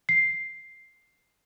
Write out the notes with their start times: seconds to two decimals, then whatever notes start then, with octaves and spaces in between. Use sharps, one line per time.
0.09 C7